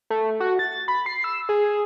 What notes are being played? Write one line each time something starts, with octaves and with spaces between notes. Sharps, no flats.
A3
F#4
A6
B5
C7
E6
G#4